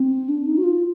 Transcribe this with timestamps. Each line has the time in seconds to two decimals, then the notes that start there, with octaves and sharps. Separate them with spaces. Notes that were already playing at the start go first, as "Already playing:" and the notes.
Already playing: C4
0.29 D4
0.46 D#4
0.58 F#4
0.64 F4